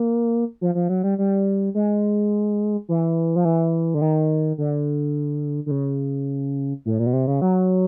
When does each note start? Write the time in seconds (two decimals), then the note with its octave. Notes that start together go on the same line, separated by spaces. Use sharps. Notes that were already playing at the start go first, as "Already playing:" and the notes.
Already playing: A#3
0.61 F3
0.75 F3
0.89 F#3
1.04 G3
1.18 G3
1.74 G#3
2.89 E3
3.36 F3
3.45 E3
3.94 D3
4.02 D#3
4.58 D3
5.66 D3
5.71 C#3
6.85 A2
6.99 A#2
7.06 B2
7.13 C3
7.27 C#3
7.42 F#3